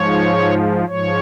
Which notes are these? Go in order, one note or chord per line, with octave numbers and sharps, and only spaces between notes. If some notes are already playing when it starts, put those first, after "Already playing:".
Already playing: G#2 F3 C#5
G#2 F3 C#5